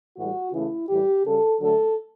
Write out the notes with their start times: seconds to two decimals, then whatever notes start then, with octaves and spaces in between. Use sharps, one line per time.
0.17 A2 E3 G3 F#4
0.53 C#3 E3 A3 E4
0.89 A2 E3 G3 G4
1.24 C#3 G3 A4
1.60 D3 F#3 A3 A4